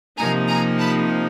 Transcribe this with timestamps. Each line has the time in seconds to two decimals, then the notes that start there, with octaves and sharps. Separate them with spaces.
0.17 C3 F3 A#3 D#4 G#5 A#5
0.48 G#5 A#5
0.79 A5 B5